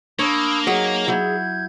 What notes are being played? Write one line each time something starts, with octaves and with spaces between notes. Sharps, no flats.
A#3 D4 C#5 B5 D#6 E6
F#3 D#4 G#4 C#5
F#3 E4 G6 G#6